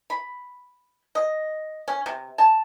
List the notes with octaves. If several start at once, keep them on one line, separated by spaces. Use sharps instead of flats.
B5
D#5
C#4
C3
A5